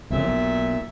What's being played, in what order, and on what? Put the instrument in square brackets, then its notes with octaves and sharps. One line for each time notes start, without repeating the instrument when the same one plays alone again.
[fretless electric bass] C2 F2 C#3 [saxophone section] A#2 E5
[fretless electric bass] B1